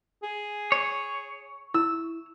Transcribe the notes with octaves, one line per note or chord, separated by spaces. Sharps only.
G#4
C#5
E4 E6